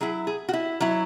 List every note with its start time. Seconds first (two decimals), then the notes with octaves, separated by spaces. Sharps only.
0.01 F#3 E4 G#4
0.27 G#4
0.49 F#4
0.53 E4
0.80 F#3 E4